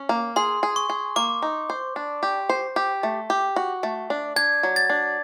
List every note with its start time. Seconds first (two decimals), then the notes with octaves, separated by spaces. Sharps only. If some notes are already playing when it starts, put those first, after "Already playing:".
Already playing: C#4
0.09 A#3
0.36 G#4 C6
0.63 G#4
0.76 C#6
0.90 G#4
1.16 A#3 D6
1.42 D#4
1.70 C5
1.96 D4
2.23 G4
2.49 C5
2.76 G4
3.03 A3
3.30 G4
3.56 F#4
3.83 A3
4.10 D4
4.36 D4 G#6
4.63 F#3
4.76 A6
4.90 D4